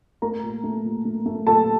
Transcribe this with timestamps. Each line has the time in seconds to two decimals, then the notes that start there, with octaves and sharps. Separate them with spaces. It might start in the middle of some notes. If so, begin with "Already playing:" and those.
0.22 A3 A#4 A#5
0.43 A#2
0.64 A3
0.84 A#2
1.05 A3
1.26 A3
1.47 A#2 A4 A5